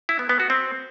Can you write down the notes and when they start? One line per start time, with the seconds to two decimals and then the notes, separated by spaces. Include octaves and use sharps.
0.09 E4
0.19 B3
0.29 B3
0.40 F#4
0.50 C4